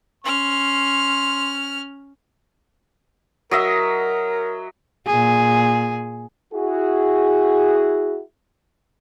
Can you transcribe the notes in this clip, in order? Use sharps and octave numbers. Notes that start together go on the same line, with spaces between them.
C#4 C6 F6
F#3 A#4 D#5 E5
A#2 G#4
E4 F#4 G#4